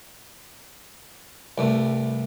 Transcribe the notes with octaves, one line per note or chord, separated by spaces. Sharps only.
C2 G2 A3